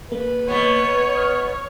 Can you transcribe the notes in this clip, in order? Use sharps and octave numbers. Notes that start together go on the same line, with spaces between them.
A#3 B4
B2 B3 C#5
D#6 F6